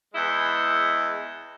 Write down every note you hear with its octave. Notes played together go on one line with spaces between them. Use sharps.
E2 G#3 E4 D#5